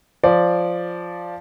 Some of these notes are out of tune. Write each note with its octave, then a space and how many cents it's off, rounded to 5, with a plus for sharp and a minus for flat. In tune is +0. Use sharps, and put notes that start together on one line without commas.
F3 +0 D5 +0